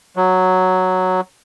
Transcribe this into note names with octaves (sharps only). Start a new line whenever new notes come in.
F#3